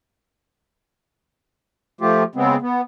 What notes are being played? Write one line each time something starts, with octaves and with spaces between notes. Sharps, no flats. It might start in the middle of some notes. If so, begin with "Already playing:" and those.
F3 A3 F4 G4
C#3 G#3 B3 C4
B3